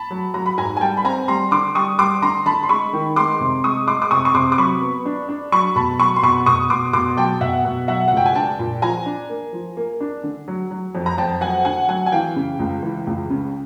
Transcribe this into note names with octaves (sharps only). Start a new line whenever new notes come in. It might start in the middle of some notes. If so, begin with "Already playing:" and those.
Already playing: A5 B5
F#3
F#3 A#5
B5
G#2 G#5 A#5
G#5
G3 G5 A5
B5
C4 G#5 A#5
G3 A#5 C6
D3 C6 D6
G3 C#6 D#6
G3 C6 D6
D3 A#5 C6
D3 A5 B5
C6
G#3 B5 C#6
D#3
G#3 C6 D6
C3
G#3 C#6 D#6
G#3 C6 D6
D6
C3 C#6 D#6
C#6
C3 C6 D6
D6
F#3 B5 C#6
B3
D4
D4
F#3 B5 C#6
B2 A5 B5
F#3 B5 C#6
C6
B2 B5 C#6
B2 C#6 D#6
B2 C6 D6
B2 C6 D6
F#3 G5 A5
B2 E5 F#5
B2
F#3 E5 F#5
C#2 F#5
G5
G#5
D4 G5 A5
A#2
F3 G#5 A#5
D4
A#3
F3
A#3
D4
D3
F#3
F#3
F2
A#5
F2 G5 A5
F#3 F#5 G#5
D3 F#5 G#5
F#3 F#5 G#5
G#5
E3 F5 G5
C#3
C#2
E3
C#2
C#3